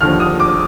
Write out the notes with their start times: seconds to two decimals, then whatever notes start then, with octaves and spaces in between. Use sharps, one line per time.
0.01 D#2 D3 F3 F6
0.20 D#6
0.40 D6